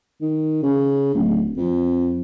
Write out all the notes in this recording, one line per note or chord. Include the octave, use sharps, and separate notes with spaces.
D#3
C#3
D1
F2